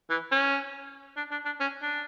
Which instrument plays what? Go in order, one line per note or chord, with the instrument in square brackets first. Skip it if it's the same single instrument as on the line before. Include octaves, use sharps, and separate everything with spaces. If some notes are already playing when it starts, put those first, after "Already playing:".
[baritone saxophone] E3
C#4
D4
D4
D4
C#4
D4